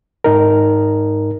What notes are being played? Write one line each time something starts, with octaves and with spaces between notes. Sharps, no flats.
G#2 D#4 A#4